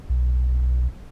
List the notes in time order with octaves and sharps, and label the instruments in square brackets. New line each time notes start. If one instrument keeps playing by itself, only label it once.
[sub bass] B1